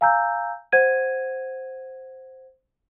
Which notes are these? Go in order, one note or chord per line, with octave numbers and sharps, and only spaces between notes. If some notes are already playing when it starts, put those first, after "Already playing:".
F5 G#5 A#5 E6 G6
C5 F#5 G#6 D#7